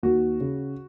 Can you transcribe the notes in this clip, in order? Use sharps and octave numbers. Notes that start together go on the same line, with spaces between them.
D#2 F#4
C#3